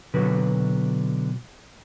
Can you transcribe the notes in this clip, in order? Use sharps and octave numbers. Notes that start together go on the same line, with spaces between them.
B2 D3 F#3 B4